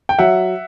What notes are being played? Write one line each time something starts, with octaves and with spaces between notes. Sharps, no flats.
G5
F#3 E5 F#5